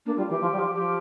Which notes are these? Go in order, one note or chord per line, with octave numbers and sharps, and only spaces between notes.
A#3 D4
G3 F4
E3 G4
F3
G3
F3
F3 G4